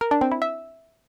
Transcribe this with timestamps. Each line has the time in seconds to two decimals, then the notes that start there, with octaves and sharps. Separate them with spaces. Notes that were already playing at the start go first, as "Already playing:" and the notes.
0.01 A#4
0.11 D4
0.21 C4
0.32 E4
0.42 E5